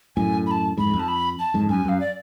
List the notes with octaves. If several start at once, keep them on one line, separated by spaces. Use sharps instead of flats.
F#2 A2 G#5
B5
A5
F2 G#2 B5
F2
A5
B5
A5
F2 G#2
F#2 G#5
F#2 F5
D5